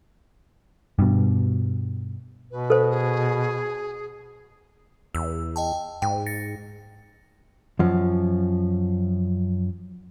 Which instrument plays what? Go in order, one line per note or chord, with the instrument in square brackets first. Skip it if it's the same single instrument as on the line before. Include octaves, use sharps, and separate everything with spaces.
[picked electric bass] G2 B2
[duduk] B2 [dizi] B4
[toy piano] A4 C5
[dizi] G#4
[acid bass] E2 [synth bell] E6
[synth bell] D#5 G5 A5
[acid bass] G#2 [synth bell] G5
[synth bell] A6 A#6 C#7
[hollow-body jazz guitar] F#2 F3